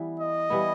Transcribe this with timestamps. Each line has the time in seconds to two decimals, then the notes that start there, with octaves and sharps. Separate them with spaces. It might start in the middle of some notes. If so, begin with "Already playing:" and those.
Already playing: E3 G3 B3 E4
0.19 D#5
0.50 E3 G3 B3 E4